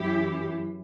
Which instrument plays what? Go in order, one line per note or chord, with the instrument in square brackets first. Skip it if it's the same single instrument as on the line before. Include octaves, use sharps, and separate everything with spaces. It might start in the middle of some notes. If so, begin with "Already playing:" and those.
Already playing: [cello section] F#2 E3 E4 G4